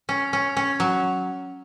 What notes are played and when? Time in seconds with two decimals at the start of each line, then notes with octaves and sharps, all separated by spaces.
0.09 C#4
0.33 C#4
0.57 C#4
0.80 F#3